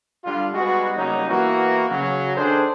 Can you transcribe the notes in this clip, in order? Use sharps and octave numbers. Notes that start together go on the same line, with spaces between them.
D3 G3 D4 F4
G3 G#3 B3 D#4 F#4
C#3 F#3 G3 A#3 C#4 D#4
E3 A#3 B3 E4 F#4
C#3 F#3
D#3 D4 G#4 A4 C5